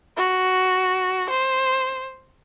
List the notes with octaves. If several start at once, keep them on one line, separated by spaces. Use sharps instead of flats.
F#4
C5